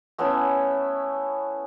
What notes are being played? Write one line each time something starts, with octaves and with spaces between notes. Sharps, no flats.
A3 B3 C#4 E4